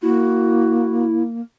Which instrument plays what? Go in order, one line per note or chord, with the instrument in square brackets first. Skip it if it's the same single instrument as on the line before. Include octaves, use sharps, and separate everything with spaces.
[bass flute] A#3 [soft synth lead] E4 [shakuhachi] F#4